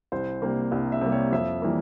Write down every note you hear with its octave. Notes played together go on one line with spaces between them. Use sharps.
C2 C5
C3 G3 A#3
C2
E5
C3 G3 A#3
C#5
F2 E5
E3 G3 A#3